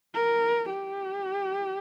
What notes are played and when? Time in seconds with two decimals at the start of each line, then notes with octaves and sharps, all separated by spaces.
0.15 A#4
0.69 G4